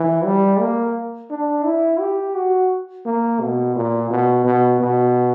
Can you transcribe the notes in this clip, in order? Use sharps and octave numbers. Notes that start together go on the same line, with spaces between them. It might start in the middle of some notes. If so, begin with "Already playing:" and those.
Already playing: E3
G3
A#3
D4
E4
G4
F#4
A#3
B2
A#2
B2
B2
B2